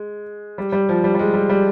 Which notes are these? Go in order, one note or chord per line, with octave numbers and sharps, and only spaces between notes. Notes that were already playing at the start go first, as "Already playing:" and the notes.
Already playing: G#3
G3
G3
F3
G3
G3
G#3
G3
G3